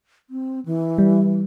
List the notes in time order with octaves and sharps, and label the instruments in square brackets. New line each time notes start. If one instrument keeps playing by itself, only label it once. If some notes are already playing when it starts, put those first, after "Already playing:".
[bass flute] C4
E3
[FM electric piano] G3